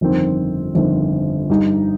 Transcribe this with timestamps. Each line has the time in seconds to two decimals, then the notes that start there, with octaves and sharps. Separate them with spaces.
0.01 G1 F2 D#3 C4
0.75 G1 F2 D#3 C4
1.50 G2 G3 D#4